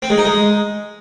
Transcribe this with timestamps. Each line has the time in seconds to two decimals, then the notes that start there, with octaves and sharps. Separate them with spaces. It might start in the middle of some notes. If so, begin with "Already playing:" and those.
0.02 C4
0.10 G#3
0.18 D#4
0.25 G#3